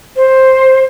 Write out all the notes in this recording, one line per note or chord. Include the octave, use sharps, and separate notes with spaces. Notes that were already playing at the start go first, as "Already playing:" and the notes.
C5